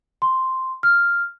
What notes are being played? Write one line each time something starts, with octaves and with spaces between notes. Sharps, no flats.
C6
F6